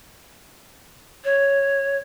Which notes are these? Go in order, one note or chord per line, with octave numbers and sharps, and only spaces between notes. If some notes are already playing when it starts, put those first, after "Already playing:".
C#5